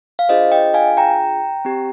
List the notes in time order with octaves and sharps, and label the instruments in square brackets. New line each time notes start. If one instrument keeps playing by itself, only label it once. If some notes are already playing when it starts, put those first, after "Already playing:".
[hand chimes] F5
D4 F4 G#4 C5 D#5
D#5 G5
F5 G#5
G5 A#5
C4 G4